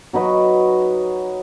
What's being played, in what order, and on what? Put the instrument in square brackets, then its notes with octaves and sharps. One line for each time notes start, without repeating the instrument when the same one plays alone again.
[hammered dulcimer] F#3 D#4 B4